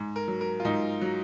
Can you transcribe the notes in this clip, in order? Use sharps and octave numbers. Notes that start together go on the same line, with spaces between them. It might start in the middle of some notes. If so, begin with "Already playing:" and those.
Already playing: G#2
A#4
F#3
A#4
F4
G#2 D#4
F#3